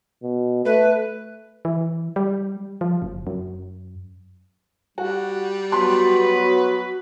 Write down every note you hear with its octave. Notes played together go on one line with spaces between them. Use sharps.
B2
A3 B4
E3
G3
F3
F#1
F#2
G3 F#4
F#3 B3 F#4 B4 C6